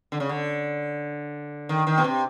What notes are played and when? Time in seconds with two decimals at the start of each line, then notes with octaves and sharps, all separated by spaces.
0.12 D3
0.20 C#3
0.29 D3
1.69 D#3
1.87 D#3
1.98 B2
2.04 C3